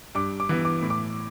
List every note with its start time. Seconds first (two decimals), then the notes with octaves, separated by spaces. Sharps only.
0.15 G2 D6
0.40 D6
0.49 E3 B3
0.65 D6
0.82 A2
0.90 D6